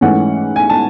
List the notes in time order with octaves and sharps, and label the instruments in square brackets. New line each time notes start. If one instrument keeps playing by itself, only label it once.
[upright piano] G#2 E3 A3 C#4 F#5
G#5
A5